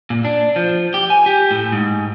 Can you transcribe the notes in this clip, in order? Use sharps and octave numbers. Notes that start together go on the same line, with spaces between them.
A#2
D4
F3
G4
G#5
G4
A2
G#2